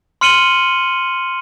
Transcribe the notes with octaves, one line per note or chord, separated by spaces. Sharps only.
C6 F6 C#7 D#7 F#7 G7